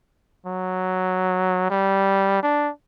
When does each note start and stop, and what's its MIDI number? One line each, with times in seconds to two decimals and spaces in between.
0.46 1.67 54
1.70 2.38 55
2.43 2.69 62